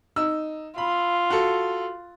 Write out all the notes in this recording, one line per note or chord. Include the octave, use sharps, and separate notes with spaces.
D#4 E6
F4 B5
F#4 A4